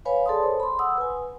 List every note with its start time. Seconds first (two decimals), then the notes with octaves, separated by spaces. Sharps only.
0.05 B4 C#5 F5 G#5 B5
0.26 G#4 A4 D5 A5 C6 D#6
0.43 C5 C#5 A5
0.60 B5 C6
0.79 F#5 D#6 E6
0.98 B4 G#5